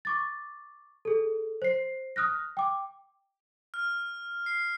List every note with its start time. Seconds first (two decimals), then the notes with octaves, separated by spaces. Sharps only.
0.05 C#6 D6 A6
1.05 G#4 A4
1.62 C5 C7
2.16 D#6 F6 F#6 A#6
2.57 G5 D6
3.74 F6
4.46 C7